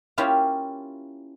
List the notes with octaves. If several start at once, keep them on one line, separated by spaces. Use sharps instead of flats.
A#3 C#4 E4 F4 G4 C5